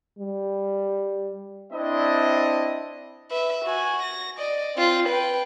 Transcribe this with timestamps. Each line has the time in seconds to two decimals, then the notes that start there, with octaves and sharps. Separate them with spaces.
0.19 G3
1.73 C4 D4 E4 D#5
3.31 B4 E5
3.65 F#4 G#5
4.02 A#6
4.38 D5 D#5
4.75 C4 F4
5.08 B4 G5